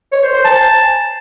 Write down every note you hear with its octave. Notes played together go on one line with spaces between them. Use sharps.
C#5
C5
C5
A5